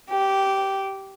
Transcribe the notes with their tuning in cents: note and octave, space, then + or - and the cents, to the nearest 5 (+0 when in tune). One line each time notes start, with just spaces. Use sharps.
G4 -10